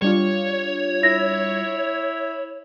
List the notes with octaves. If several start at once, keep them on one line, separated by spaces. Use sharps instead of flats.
G3 D4 F4 C#5
E4 A#6